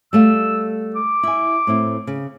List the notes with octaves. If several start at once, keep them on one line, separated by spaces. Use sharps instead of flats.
G3 A3 F5 E6
D6
E4 G#5
A2 C4 E4
C#3